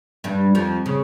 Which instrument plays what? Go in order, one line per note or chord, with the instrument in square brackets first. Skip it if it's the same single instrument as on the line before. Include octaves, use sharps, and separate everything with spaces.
[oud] G2 G3
F2 F3
C#3